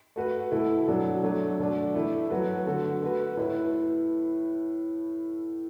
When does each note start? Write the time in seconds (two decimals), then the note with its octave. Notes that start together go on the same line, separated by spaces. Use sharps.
0.16 A3 F#4 B4
0.51 B2 A3 E4 A4
0.88 B2 F#3 D4 A4
1.24 F#3 A3 D4 A4
1.60 B2 A3 D4
1.94 E3 A3 E4
2.30 F#3 A3 F#4 B4
2.66 D3 B3 F#4 A4
3.02 A3 F#4 B4
3.37 A2 A3 E4 B4